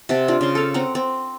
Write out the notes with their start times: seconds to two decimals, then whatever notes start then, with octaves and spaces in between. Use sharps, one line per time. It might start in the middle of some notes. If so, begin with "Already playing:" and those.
0.09 C3 F#5 A5
0.28 D4 F4
0.41 C#3 C6
0.55 A4 F5
0.74 C4 F#5 A#5
0.95 C4